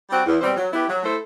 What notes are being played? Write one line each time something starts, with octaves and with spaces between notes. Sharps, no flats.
G3 C4 F#4
E2
B2 G3 C4
F#3
B3 E4 G4 B4
F#3
A3 E4 A4 C5